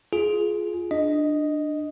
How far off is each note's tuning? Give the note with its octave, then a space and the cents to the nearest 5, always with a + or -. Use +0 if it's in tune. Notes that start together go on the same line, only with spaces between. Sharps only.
F4 +0 G#4 +15
D4 +20 D#5 +0